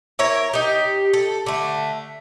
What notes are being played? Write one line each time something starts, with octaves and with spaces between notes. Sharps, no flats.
E4 A#4 C#5
D#4 G4
A4
D3 A3